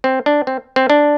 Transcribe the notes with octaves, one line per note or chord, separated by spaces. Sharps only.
C4
D4
C4
C4
D4